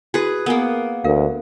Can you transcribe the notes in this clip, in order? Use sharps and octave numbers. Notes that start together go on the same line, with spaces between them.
E4 F#4 G#4 B4
A#3 B3 A#4 G#5
D2 A#4 F5